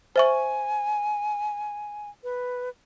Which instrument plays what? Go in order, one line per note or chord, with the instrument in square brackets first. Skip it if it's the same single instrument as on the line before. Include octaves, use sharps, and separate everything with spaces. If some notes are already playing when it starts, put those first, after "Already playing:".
[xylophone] C5 E5 C#6 [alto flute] G#5
[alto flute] B4